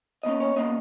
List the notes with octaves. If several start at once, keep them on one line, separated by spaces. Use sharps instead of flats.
B2 A#3 C#4 D#5
C#5
B2 A#3 C#4 D#5